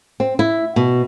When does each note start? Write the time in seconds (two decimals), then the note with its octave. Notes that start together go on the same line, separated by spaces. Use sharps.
0.20 C4
0.39 E4
0.76 B2